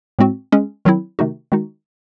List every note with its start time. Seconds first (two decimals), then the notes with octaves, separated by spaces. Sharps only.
0.19 A2 G#3 C4 F#4
0.52 G#3 C#4 G#4
0.85 D#3 F#3 C4 E4
1.19 C3 D#3 A3 D#4 F#4
1.52 D#3 G#3 D#4 F#4